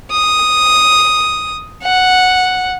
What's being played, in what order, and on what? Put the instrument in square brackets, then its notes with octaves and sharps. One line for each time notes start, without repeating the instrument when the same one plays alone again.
[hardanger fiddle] D#6
F#5